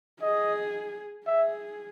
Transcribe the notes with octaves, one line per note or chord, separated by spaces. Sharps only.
G#4 D#5
G#4 E5